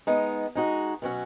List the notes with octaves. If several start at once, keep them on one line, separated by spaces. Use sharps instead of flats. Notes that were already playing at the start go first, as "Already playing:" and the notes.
G#3 B3 D#4
G#3 D#4 F#4
B2 F#3 C#4 F#4